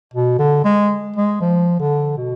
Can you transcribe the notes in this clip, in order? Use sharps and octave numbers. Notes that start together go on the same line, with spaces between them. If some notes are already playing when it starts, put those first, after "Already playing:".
B2
D3
G#3
G#3
F3
D3
B2